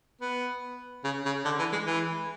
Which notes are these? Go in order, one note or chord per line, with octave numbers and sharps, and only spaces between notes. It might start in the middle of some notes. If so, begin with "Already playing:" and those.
B3
C#3
C#3
D3
E3
G#3
E3